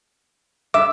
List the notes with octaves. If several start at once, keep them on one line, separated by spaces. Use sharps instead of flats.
G2 E5 D6